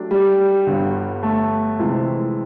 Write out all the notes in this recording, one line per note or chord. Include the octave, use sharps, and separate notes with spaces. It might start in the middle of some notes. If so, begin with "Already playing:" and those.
Already playing: F#3 A3 D4 G4
G3
G1 G2 D3
A3
F2 C3 E3 G#3